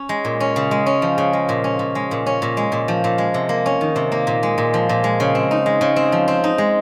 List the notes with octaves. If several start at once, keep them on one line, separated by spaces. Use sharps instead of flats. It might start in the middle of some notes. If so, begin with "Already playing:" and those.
Already playing: C#4
G#3
A#2
C#4
C#3
G#3
C#4
F3
C#3
G#3
A#2
C#4
A#2
G#3
A#2
C#4
A#2
G#3
A#2
F3
A#2
G#3
C3
A#3
C#4
D#3
C3
A#3
A#2
G#3
A#2
F3
A#2
G#3
C#3
C4
D#4
G#3
C#3
C4
F3
C4
D#4
G#3